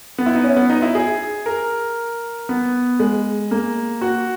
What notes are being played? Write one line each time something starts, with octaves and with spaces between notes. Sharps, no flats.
B3
E4
D#4
C#4
B3
D#4
E4
G#4
A#4
B3
G#3
A#3
F#4